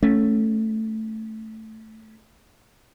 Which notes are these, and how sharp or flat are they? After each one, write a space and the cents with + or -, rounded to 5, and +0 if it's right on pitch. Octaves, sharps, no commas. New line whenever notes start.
A3 +0 C#4 +0